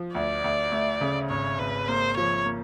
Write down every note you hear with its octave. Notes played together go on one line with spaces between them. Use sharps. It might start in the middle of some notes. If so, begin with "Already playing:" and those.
Already playing: F3
D2 D5
D2
A3
C#3
G#1 C#5
G#1 B4
A#3 C5
F3 C#5
A#3